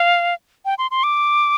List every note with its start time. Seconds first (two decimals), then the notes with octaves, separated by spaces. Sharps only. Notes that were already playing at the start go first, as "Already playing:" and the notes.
Already playing: F5
0.65 G5
0.78 C6
0.91 C6
1.03 D6